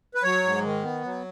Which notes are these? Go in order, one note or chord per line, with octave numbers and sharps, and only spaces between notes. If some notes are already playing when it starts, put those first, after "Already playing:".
B4
F#3 C#5
G#2
D#3
B3
F#3